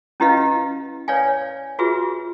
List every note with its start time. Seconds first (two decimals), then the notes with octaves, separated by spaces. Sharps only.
0.20 C#4 E4 G4 B4 D#5 F5
1.08 B4 C#5 D5 F5 G#5
1.79 F4 F#4 G#4 B4 E5